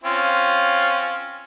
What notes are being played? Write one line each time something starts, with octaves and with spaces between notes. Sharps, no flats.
C4 C#4 F4